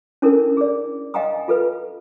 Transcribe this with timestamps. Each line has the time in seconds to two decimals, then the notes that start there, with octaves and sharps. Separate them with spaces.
0.22 C#4 D4 E4 A4 A#4
0.57 G#4 D5
1.14 D#5 F5 G5 G#5 A#5 D#6
1.48 F4 A4 B4